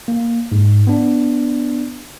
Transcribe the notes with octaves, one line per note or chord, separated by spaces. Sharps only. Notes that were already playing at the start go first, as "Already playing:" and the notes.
A#3
G#2
B3 D4